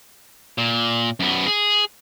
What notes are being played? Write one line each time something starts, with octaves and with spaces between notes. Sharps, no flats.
A#2
F#2 B3
G#4